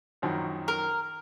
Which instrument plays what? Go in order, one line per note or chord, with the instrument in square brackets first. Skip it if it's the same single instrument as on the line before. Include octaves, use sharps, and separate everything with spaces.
[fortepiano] A#1 F#2 D#3
[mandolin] A#4